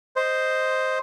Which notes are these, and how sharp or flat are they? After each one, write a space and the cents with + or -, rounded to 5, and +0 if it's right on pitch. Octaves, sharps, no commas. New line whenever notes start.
C5 +0 D#5 +0